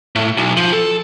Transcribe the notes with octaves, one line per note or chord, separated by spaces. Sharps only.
A2
B1
F3
A4